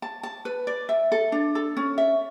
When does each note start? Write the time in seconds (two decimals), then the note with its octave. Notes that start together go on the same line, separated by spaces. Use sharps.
0.02 A5
0.23 A5
0.45 B4
0.67 D5
0.89 E5
1.12 A4
1.32 D4
1.55 A4
1.77 C#4
1.98 E5